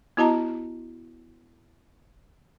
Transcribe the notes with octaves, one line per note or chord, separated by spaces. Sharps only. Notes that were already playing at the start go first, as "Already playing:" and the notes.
B3 E4 F#4 D#5 A5 A#5